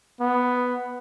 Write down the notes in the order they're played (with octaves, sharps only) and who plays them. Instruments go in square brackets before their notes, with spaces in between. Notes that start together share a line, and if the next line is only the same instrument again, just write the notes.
[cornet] B3